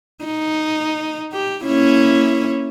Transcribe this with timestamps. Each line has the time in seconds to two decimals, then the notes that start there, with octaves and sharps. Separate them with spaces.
0.24 D#4
1.32 G4
1.66 A#3 C#4 E4